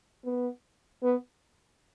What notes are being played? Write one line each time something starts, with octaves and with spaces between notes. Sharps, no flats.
B3
B3